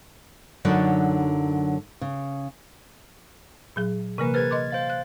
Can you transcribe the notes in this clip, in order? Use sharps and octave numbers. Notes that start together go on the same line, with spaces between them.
F#2 D3 F#3 D#4 F#4 D5
C#3
A#2 F#3 G#4
C3 E3 A#3 A#4 B4
G#4 B4 C5 F6 G#6 A6
D#5 C6 D6
C5 F5 A6
F#6